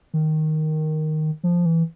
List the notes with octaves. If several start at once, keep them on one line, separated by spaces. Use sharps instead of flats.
D#3
F3
E3